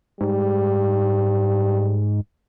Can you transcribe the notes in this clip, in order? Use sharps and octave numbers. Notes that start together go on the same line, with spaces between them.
G#2 G3